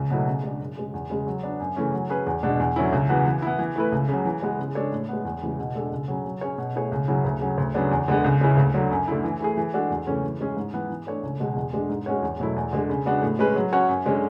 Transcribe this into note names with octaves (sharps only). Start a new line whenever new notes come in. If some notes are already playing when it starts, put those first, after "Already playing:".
Already playing: C#2
B2 F#3 A3 E4
C#3
G#3 D4
F#2
C#3 G#3
E2
C#3 G#3
F#3
B3 D4
F#2
C#3 E3 A3 C#4
F#3
C#4 G#4 B4
E2
B2 G#3 D4
E2
D3 F#3 C#4 E4
C#2
C#3 E3 B3 F#4
E3
B3 E4
E3
A3 E4 B4
C#2
C#3 F#3
E3
G#3 B3
C#3
G#3 D4 A4 C#5
A2
G#3 B3
E2
C#3 E3 G#3
B2
G#3 D4 A4
C#2
C#3 F#3
F#3
C#4 G#4 C#5
B2
A3 E4 G#4 C#5
C#2
C#3 F#3 C#4 E4
D2
C#3 F#3
D2
C#3 F#3 B3 D4
E2
D3 G#3 B3
C#2
C#3 G#3 C#4 E4
D2
D3 F#3
F#2
D3 A3 E4
E3
A3 E4 G#4
E3
G#3 D4 F#4 A4
E2
C#3 E3 A3 C#4
E3
G#3 C#4 G#4
G#2
E3 B3
E3
A3 D4 A4 C#5
C#2
B2 G#3
E2
D3 G#3 D4
G#2
G#3 C#4 F#4 C#5
E2
B2 F#3 A3 E4
E2
D3 G#3
C#3
G#3 B3 D4 F#4
A2
G#3 C#4 G#4 B4
F#3
C#4 F#4 C#5
F#2
D3 G#3 C#4